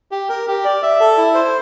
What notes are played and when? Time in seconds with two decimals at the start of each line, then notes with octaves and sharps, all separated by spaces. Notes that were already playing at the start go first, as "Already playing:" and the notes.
0.11 G4
0.29 A#4
0.48 G4
0.64 D5
0.82 E5
1.00 A4
1.17 E4
1.34 C5